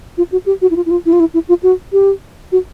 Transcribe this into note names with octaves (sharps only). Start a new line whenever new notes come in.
F4
F#4
G4
F#4
E4
F4
E4
F4
E4
F4
E4
E4
F4
F#4
G4
F#4